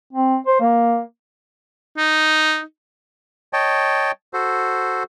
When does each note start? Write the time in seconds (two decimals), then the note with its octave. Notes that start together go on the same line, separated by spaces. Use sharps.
0.13 C4
0.47 C5
0.61 A#3
1.98 D#4
3.53 C#5 D#5 G5 A5
4.33 F#4 A4 C5